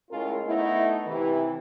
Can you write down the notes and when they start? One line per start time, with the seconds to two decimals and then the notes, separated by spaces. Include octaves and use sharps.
0.11 A2 G#3 C#4 F4 A#4
0.45 A3 B3 D#4 E4
1.07 C3 E3